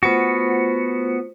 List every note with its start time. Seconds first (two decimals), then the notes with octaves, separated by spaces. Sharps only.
0.03 A3 B3 F4 F#4 C5